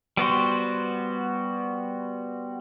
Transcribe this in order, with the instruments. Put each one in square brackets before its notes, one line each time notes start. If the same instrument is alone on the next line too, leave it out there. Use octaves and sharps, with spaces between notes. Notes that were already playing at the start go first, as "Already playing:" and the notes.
[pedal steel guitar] G3 B3 F#4 C5